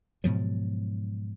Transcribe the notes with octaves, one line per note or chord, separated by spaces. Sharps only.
G#2 B2 F3 F#3